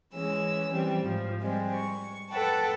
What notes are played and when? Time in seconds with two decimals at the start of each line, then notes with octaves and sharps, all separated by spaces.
0.13 E3 G#3 C#4 E6
0.71 E3 G3 C4
1.03 G#2 F3
1.42 G3 G#3 C4
1.75 C#6
2.30 A4 B4 F#5 G5 A5